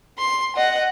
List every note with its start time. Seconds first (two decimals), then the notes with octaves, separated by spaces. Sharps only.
0.18 C6
0.56 D#5 F#5